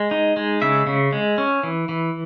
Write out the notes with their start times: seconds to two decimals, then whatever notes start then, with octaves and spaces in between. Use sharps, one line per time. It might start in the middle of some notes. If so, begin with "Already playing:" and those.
Already playing: G#3
0.11 D#4
0.37 G#3
0.62 C#3 E5
0.87 C#3
1.13 G#3
1.38 C#4
1.63 E3
1.89 E3